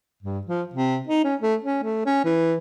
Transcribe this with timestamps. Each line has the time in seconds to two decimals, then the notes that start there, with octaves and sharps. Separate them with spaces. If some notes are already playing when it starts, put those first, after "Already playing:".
0.23 G2
0.47 F3
0.74 C3
1.07 D#4
1.24 C#4
1.41 A3
1.65 C#4
1.83 A3
2.06 C#4
2.25 E3